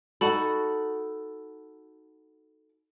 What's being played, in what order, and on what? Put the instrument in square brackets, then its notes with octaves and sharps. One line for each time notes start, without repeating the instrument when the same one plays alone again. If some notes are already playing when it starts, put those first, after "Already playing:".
[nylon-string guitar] D#4 F#4 A4 [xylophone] B5